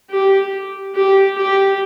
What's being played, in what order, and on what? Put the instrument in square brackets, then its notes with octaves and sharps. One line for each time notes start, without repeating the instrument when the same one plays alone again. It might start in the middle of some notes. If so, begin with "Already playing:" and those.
[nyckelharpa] G4
G4
G4